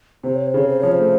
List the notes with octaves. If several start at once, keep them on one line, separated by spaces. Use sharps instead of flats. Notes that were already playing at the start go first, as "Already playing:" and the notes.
C3 C5
C#5
C5
C#3 C#5
C5
F3 C#5
C5
A3